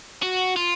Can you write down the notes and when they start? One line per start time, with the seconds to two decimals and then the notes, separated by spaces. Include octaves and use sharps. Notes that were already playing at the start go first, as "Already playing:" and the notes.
0.23 F#4
0.56 F4